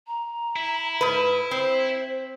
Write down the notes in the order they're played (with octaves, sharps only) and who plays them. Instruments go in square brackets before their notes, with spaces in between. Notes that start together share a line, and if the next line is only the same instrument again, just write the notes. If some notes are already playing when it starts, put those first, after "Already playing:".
[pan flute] A#5
[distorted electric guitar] E4
[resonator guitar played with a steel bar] G#2 B4
[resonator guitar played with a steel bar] C4 [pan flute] C5